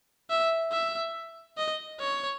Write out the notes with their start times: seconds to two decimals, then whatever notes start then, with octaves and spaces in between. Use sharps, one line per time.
0.30 E5
0.72 E5
1.57 D#5
2.00 C#5